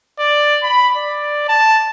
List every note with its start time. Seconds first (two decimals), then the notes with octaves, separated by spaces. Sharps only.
0.19 D5
0.63 B5
0.97 D5
1.49 A5